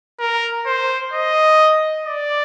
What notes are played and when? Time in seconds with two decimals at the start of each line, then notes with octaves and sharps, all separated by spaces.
0.19 A#4
0.66 C5
1.12 D#5
2.06 D5